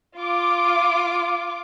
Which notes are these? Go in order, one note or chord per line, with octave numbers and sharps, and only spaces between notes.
F4 D6